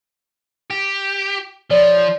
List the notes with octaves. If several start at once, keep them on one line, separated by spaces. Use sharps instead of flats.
G4
F3 C#5 D5